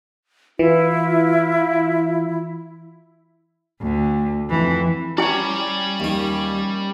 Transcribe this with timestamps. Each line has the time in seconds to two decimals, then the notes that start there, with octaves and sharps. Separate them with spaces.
0.59 E3 E4 F4
3.81 D2
4.50 F2 E3
5.18 G3 C#4 E4 C#5 D5 G5
6.00 D#2 D#3